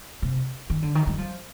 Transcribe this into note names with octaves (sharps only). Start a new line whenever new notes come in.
C3
D#3
D3
D#3
G3
F3